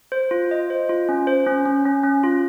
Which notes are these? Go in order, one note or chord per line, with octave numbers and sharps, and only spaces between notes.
C5
F4
D#5
C5
F4
C#4
C5
C#4
C#4
C#4
C#4
F4